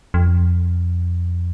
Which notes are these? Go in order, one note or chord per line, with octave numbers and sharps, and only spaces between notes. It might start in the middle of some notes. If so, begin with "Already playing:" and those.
F2